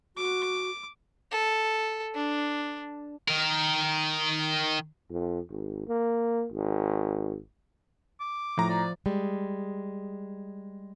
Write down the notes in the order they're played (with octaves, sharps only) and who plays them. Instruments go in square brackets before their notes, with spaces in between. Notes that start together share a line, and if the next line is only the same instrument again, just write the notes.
[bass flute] F#4 [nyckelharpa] D6
[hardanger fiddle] A4
D4
[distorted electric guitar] D#3 A#4
[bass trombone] F2
G#1
A#3
G#1
[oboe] D6
[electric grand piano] A2 A#5 [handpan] F3
[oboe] D5
[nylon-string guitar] G3 G#3